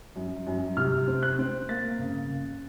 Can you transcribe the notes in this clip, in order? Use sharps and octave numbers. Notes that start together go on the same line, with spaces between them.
F#2
F#2
C3 F6
C4
F#6
C4
A#3 A6
C#3
C#3